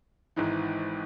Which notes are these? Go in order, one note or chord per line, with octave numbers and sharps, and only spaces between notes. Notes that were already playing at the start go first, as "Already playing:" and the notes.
G#1 G#2 E3